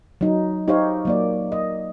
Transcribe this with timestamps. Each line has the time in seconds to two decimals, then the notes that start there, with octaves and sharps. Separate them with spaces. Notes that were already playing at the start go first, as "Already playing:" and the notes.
0.21 F#3 D#4
0.68 D#4 G4 C5 C#5 F5
1.05 F#3 A#3 D5
1.52 D#5